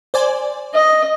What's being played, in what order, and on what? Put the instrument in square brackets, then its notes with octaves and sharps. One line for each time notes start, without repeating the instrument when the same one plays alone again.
[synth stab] C5 D5 G#5
[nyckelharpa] D#5